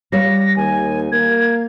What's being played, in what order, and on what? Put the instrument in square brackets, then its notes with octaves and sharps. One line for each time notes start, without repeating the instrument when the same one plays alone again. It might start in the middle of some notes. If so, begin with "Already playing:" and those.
[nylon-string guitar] G3 C#5 F5 [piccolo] A#6
[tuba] D#2 [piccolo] G#5
[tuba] A#3 [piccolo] G#6